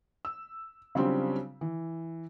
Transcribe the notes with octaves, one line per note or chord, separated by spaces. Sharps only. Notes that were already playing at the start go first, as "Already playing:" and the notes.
E6
C#3 F#3 G3 C4 D4 F4
E3